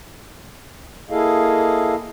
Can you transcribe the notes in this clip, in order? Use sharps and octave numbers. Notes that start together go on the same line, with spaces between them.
A#3 E4 G#4 A4 D#5 F5